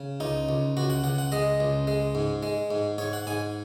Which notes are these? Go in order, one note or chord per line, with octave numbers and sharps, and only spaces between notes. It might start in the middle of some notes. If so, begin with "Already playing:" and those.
Already playing: C#3
C#2 D#4
C#2
C#2 F#4
F#5
C#2 F#5
F#5
G#3 D#5
C#2
G#3
G#2
G#3
G#2
G#2 C#5
F#5
G#2 G#5